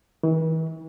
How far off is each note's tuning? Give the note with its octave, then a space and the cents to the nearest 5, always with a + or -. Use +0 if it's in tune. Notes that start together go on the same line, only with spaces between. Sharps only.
E3 -40